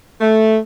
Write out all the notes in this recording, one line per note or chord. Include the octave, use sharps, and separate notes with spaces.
A3